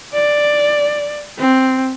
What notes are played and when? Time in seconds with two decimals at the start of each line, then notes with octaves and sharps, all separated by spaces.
0.14 D5
1.39 C4